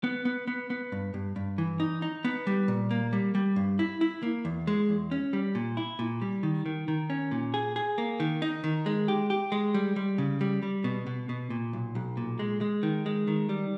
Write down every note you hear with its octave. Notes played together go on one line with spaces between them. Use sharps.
B3
B3
B3
B3
G2
G2
G2
E3
D#4
D#4
B3
G3
A#2
A#3
G3
G3
G2
E4
E4
A#3
E2
G#3
E2
C#4
G3
A#2
E4
A#2
G3
D#3
D#3
D#3
C#4
A#2
G#4
G#4
A#3
D#3
D#4
D#3
G#3
G4
G4
G#3
G3
G3
C#3
G3
G3
B2
B2
B2
A#2
B1
B1
A#2
G#3
G#3
D#3
G#3
D#3
G3